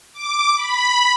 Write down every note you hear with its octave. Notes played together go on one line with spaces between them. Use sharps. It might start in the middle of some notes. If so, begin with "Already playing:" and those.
D6
B5